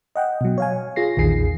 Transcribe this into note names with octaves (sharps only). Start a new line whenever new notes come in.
D#5 F#5 G5
B2 F#3
C#5 F5 G#5
F4 G#4 A#6 C7
A#1 E2 D#3 G#4 C7